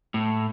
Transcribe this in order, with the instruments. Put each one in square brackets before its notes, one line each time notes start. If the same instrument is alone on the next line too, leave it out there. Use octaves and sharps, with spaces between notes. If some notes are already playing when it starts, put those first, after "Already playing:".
[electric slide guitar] A2